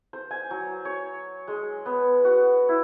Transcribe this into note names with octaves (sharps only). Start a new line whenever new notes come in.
C5
G#5
F#3
C#5
G#3
B3
F#4
E4